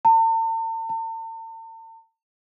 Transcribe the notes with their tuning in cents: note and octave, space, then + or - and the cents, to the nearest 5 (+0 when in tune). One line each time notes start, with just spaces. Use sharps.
A5 +45
A5 +45